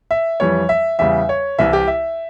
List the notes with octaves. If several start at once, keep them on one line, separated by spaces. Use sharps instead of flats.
E5
F2 E3 G3 C#5
E5
E2 C#3 G3 E5
C#5
C2 C3 E3 E5
G4
E5